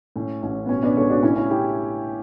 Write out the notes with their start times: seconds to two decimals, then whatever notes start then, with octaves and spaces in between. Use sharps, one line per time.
0.16 A2 C#4
0.43 A1 C#4
0.66 B3
0.69 B2 C#4
0.83 B3 D4
0.97 C#2 A4 C#5
1.10 D4 F#4
1.23 A2 C#4 E4
1.36 C#4 E4
1.50 E4 G4